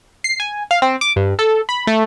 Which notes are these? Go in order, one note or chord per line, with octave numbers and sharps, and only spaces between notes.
C7
G#5
F5
C4
D6
G2
A4
B5
A3